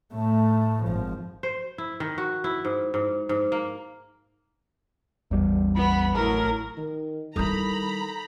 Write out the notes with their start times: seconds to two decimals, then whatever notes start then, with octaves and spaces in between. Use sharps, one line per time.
0.14 A2 A3
0.84 G#1 F3
1.43 C5
1.78 E4
2.00 D#3
2.18 F#4
2.44 E4
2.65 G#2
2.94 G#2
3.29 G#2
3.52 A#3
5.31 A1 E2 G3
5.76 B3 B5
6.15 A2 F#3 E4 A#4
6.77 D#3
7.36 D#3 G3 E4 A4 A#5 B5 D#6 G6